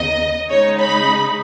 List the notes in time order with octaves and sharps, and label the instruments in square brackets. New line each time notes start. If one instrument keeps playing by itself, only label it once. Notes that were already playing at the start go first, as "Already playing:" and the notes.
Already playing: [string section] D#2 C#3 B3 D#4 D#5
C#3 G#3 D#4 C#5
B5